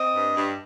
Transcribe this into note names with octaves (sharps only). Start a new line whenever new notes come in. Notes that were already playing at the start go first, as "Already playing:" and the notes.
Already playing: C4 D#5
G2
G2